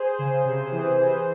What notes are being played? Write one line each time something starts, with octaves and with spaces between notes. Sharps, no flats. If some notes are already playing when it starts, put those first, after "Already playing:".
Already playing: G#4 C5
C#3
C3
E3
E3